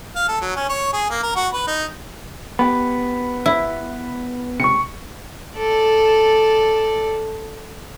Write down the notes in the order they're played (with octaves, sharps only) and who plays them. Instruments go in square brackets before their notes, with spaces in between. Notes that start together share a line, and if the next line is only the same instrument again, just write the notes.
[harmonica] F5
A4
F#3
C#4
C#5
G#4
A#3
A#4
F#4
B4
D#4
[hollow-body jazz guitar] B3 G4 [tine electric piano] B5
[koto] E4
[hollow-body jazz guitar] C#2 C3 [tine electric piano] C#6 C#7
[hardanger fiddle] A4 D5